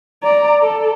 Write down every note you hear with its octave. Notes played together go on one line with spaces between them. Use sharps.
D5 A#5
A4